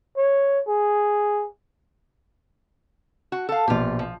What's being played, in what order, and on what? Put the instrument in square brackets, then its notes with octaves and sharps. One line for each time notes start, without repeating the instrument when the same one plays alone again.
[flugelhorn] C#5
G#4
[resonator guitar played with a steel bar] F#4
A4 F5
[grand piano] A#1 B2 [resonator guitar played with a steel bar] F4 G4
[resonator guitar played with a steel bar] F3